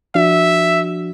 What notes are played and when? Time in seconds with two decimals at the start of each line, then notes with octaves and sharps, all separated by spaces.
0.15 F3 D4 F#4 E5